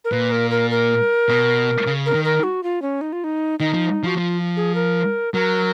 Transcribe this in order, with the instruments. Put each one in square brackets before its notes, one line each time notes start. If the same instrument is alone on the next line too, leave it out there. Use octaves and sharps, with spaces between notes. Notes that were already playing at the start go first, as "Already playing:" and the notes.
[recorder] A#4
[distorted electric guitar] A#2 [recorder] B4
[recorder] A#4
A#4
A#4
[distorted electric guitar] B2
C#3
[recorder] A#4
[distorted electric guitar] D#3
[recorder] A#4
F#4
F4
C#4
D#4
F4
D#4
[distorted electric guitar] D#3 [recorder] D#4
[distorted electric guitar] F3
[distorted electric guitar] F3 [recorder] F#4
[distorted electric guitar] F3 [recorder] F4
[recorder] G#4
A#4
[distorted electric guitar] F#3 [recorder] A#4